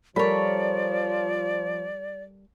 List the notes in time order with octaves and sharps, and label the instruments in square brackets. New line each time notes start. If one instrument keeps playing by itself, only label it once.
[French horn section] F3 [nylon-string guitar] G3 A4 A#4 [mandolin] C#5 B5 [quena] D5